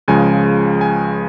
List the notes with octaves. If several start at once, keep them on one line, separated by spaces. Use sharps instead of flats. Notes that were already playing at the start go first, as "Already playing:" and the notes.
C#2 C#3 F3 G#3 G#5
G#5